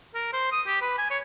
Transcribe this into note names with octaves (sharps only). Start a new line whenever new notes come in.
A#4
C5
D#6
G4
B4
G#5
C#5